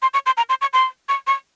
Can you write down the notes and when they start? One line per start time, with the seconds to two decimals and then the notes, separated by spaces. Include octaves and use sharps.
0.02 C6
0.14 C#6
0.26 C6
0.37 A#5
0.49 C6
0.61 C#6
0.73 C6
1.09 C#6
1.27 C#6